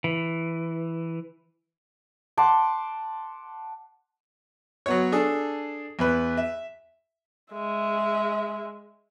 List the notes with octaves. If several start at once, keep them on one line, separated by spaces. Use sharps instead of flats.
E3
F#5 A5 C6 D6
F#3 B3 C#5
D4 G#4 A4
E2 B4
E5
G#3 E5